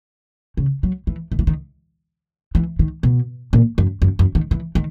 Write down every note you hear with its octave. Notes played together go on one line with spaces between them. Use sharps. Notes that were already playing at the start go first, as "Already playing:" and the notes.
C#3
F#3
E3
D#3
E3
D#3
E3
D#3
B2
A#2
F#2
F#2
F#2
D#3
E3
D#3